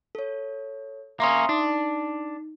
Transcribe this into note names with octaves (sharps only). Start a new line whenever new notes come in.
A4 C#5
A#3 C#4 E5 C6 D#6
D4 D#4